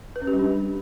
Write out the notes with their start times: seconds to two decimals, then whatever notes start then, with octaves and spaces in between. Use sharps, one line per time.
0.16 B4
0.22 C#4
0.27 G4
0.33 G3
0.39 D4